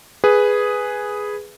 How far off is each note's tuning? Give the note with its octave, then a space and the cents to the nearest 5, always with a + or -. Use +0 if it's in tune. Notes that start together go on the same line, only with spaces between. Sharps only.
G#4 +0 B4 +0